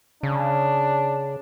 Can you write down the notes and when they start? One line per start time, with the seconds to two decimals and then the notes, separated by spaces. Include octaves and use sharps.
0.23 C#3 D4